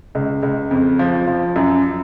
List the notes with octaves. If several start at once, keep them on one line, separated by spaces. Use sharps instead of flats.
C#2
C#2
F2
F3
F3
F#2